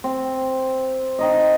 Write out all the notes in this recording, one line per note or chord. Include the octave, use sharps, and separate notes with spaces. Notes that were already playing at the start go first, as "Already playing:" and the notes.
C4
C4 D#4 D#5